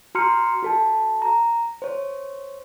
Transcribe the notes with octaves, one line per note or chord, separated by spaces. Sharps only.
F#4 A#5 C6 F6 C#7
F#4 A4 A5
A#5
C5 C#5